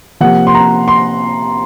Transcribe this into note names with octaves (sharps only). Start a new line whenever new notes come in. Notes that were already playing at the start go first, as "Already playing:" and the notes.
C3 F3 A#3 F#5
C6
A#5
C6